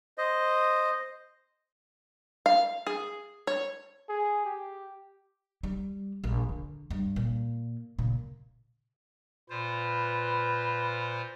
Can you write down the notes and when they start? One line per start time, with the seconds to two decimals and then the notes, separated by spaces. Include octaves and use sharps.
0.18 C5 D#5
2.46 F5
2.87 G#4
3.47 C#5
4.09 G#4
4.45 G4
5.63 G3
6.24 A#1
6.49 D3
6.90 G2
7.16 A#2
7.99 A#2 C#3
9.50 A#2 F4 B4 C5